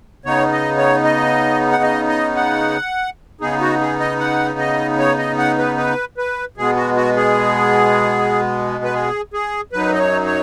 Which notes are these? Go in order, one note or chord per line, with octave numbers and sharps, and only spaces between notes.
C#3 B3 D#4 C#5
D#5
C#5
D#5
F#5
D#5
D#5
F#5
C#3 B3 D#4 G#4
F#4
G#4
D#5
F#5
D#5
C#5
D#5
F#5
B4
B4
B4
B2 G#3 B3 G#4
F#4
F#4
G#4
B4
G#4
G#4
F#2 F#3 D#4 B4
D#5
C#5
C#5